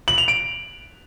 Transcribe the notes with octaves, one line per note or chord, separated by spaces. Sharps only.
F#7
F7
D7